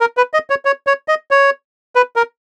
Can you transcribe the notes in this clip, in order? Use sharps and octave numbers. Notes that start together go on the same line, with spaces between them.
A#4
B4
D#5
C#5
C#5
C#5
D#5
C#5
B4
A#4